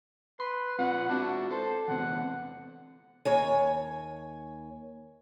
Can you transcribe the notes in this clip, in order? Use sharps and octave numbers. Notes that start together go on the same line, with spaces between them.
B4 C6
C4 F4 B4 F#5
D4 E4 F#4 B4
A4 C5
E2 C3 B3 F#5
D#2 C#5 G#5